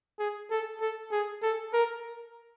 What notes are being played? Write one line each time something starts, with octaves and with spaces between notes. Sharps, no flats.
G#4
A4
A4
G#4
A4
A#4